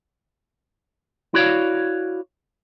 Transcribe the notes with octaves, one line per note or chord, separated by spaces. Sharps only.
E4 F#4 C#5 D5 F5